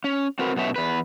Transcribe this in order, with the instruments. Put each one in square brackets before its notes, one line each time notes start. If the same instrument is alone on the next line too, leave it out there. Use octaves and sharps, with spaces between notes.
[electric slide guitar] C#4
C4 F#4 A#4 B4
F#2 B2 B3 C#5 E5
E2 B4